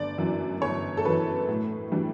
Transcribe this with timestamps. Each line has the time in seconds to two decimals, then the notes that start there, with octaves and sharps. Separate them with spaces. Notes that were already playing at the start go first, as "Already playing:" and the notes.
Already playing: G1 D5
0.18 F#2 E3
0.62 G1 C#5
0.97 A4
1.05 F#2 E3 B4
1.49 A2
1.92 E3 G3 D4